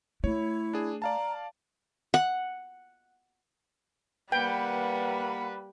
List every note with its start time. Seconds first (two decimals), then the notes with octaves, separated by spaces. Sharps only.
0.24 A3 E4 C#5
0.73 D4 G#4
1.02 D5 F5 A5 A#5
2.14 F#5
4.32 G3 A#3 B4 F#5 G5